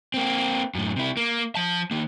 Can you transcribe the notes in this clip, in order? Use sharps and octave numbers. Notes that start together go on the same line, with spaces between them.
A#3 C4
F#2 A2
C3 E4
A#3
F3 A5
D#3 A#3